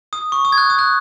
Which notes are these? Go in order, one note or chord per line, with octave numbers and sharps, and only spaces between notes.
D#6
C#6
D#6
G#6
F#6
D#6
F#6